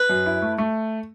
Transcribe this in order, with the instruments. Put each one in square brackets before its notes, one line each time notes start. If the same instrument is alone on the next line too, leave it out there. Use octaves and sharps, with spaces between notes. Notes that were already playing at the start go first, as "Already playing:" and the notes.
Already playing: [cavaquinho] B4
[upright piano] F#2
E4
A3
A3